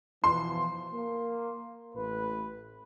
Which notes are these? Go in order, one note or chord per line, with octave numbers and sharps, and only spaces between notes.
B2 E3 F3 C6
A#3
A1 A2 B4